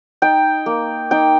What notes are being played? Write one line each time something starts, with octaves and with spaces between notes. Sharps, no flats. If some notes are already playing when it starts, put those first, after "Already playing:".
D#4 G5
A#3
D#4 G5